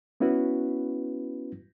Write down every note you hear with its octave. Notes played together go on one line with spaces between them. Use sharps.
B3 C#4 E4 F#4 B4